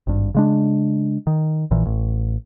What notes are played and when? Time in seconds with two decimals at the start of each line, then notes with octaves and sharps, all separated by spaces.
0.07 G#1 G2
0.35 C#3 G#3 D4
1.27 D#3
1.71 A#1 A#2 E3
1.85 A1